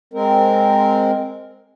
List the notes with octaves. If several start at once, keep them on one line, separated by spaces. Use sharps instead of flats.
G#3 C4 A#4